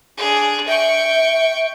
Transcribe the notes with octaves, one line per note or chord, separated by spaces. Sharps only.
D4 G#4
E5 G5 C#6